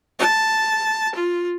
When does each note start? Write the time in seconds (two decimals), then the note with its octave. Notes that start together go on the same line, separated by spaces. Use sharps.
0.19 A5
1.15 F4